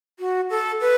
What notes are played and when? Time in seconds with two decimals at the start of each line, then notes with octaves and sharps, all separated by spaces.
0.19 F#4
0.50 A4
0.81 B4